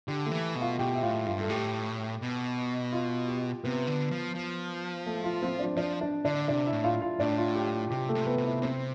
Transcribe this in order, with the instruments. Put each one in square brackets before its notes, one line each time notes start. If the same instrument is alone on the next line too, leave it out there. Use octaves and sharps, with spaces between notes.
[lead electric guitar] D3 [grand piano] G4
[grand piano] A3 A4
[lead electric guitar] E3
B2
[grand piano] F4 F5
[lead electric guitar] B2 [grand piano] G4 G5
[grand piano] E5
[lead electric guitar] A2 [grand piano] F4 F5
[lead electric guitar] G2 [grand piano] F4 F5
[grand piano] A4
[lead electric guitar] A2 [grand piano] G4
[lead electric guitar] B2
[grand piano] F4
G4
[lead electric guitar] C3 [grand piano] B3 B4
[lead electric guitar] D3
F3
F3
[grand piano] A3 A4
F4
C4 C5
D4 D5
[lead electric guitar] F3 [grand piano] D4 D5
[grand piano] D4 D5
[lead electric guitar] D3 [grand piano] D4 D5
[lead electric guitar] C3 [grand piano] D4 D5
[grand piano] E4 E5
[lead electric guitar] A2
[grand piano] F4 F5
F4 F5
[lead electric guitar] A2 [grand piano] D4 D5
[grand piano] F4
G4
[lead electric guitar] C3 [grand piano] G4
[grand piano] A3 A4
[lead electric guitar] C3
[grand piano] B3 B4
[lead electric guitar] C3
[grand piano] E4 E5
[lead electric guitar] C3 [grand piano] C4 C5